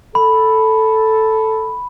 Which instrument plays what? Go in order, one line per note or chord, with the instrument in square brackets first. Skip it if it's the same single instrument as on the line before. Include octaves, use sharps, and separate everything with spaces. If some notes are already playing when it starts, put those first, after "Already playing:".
[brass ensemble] A4 [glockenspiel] B5